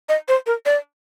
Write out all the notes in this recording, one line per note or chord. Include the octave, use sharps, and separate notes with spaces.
D#5
C5
A#4
D5